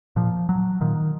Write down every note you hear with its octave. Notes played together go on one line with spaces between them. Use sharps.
A#2 F3
F#3
A#2 D#3